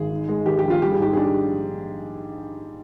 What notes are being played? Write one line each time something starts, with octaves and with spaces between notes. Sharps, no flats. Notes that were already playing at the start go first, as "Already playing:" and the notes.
Already playing: G#1 G#4
G#2
G#3
D#3 G4
G4
A#1
F4
G3 G4
G#4
G#2 G4
D4 G#4
G4